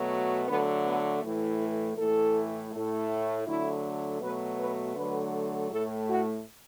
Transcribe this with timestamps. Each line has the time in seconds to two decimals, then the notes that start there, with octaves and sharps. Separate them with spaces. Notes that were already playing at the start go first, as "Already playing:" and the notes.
Already playing: B2 F#3 A3
0.48 D3 F#3 A3 B3
0.85 B3
1.23 A2 E3 A3
1.61 A4
1.98 A2 E3 A3 A4
2.72 A2 A3
3.47 D3 F#3 A3 E4
4.22 B2 F#3 A3 B4
4.60 B4
4.96 D3 F#3 A3 B4
5.71 A2 A3 A4
6.09 F#4